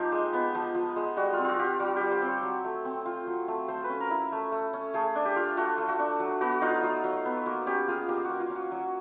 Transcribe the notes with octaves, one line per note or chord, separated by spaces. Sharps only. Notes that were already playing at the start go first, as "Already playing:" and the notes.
Already playing: F3 A#3 D#4 G4 C5
G#3
B3
F3
F3
G#3
G3 F#4
F4
C4
F4 F#4
F4 G4
F#4
G3 F#4
G3 G4
C5
C4
C#5
F#3
A3
C4
F4
F#3
A3
A3 C5
B4
C#4
A#4
E4
A3
A3
C#4
A3 G#4
D4
G4
F4
A3 F#4
A3
F#4
D4
F#3
B3 F#4
D#4 F4
F#3
F#3
B3
A#3 F#4
C#4 G4
F4 G#4
A#3 G4
A#3 F#4
F4
C#4
F#4
F#3